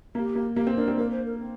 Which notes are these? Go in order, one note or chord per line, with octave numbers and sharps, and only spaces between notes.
A#3 G4
A#3
A#3 G4
C4
D4 A#4
C4
A#3 A#4
C5
A#4
C4